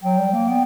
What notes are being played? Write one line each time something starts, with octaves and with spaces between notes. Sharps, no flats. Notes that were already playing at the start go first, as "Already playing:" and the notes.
F#3 G5
G3
A#3
B3